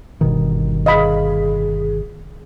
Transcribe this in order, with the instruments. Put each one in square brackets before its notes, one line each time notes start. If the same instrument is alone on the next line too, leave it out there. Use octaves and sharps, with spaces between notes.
[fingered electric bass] G1 B2 D#3
[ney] G#4 [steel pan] D#5 F5 B5